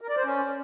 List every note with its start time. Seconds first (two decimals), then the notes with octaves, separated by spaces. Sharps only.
0.01 A#4
0.09 D5
0.17 C5
0.24 C#4